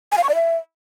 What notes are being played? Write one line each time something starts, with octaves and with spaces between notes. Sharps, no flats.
G#5
F5
C#6
D5
E5